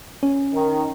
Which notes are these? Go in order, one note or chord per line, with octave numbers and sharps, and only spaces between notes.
C#4
D#3